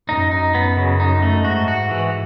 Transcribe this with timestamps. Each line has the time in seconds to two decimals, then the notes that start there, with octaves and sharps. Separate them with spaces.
0.09 F#2 D#4
0.31 D#4
0.53 F#2 B3
0.77 C#3
1.00 D#4
1.22 A3
1.45 G#2 F#4
1.68 F#4
1.91 E3